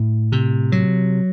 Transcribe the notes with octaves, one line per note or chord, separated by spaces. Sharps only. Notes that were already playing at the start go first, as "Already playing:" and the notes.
Already playing: A2
C3
F#3